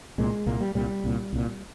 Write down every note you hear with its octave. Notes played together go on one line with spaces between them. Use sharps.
C2 A#2 G#3
C2 A#2 A#3
G3
C2 A#2 G3
C2 A#2
C2 A#2